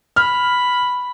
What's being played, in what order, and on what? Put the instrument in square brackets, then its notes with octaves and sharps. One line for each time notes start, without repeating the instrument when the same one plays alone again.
[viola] B5 [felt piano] F6